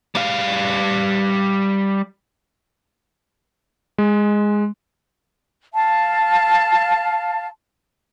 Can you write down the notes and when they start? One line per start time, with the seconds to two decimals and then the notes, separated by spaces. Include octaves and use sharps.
0.15 G3 F5
3.98 G#3
5.74 F5 A5